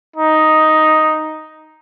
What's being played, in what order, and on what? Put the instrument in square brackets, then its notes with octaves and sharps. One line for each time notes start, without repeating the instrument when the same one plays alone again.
[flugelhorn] D#4